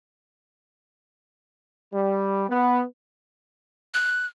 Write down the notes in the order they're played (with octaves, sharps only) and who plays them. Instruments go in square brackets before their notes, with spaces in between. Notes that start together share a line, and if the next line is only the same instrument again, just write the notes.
[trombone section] G3
B3
[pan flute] F#6